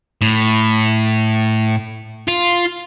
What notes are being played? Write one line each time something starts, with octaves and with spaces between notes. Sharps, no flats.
A2
F4